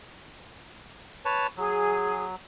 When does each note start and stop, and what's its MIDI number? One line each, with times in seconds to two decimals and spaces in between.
1.25 1.47 71
1.25 1.47 73
1.25 1.47 81
1.57 2.36 54
1.57 2.23 68